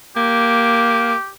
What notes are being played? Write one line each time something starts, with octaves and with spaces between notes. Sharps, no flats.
A#3 G4